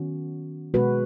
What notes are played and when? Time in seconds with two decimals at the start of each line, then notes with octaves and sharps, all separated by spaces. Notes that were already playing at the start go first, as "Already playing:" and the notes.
Already playing: D#3 B3 C#4 F#4
0.74 B2 G#3 B3 F#4 B4